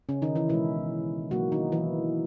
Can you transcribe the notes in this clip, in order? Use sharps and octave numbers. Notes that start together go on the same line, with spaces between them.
C#3 C#4
D#3 D#4
E3 E4
B2 E3 G#3 E4
B2 F#3 A#3 F#4
D#3 D#4
E3 E4